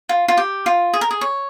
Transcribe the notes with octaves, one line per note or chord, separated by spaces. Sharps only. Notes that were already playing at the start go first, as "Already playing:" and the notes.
F4
F4
G4
F4
G#4
A#4
G#4
C#5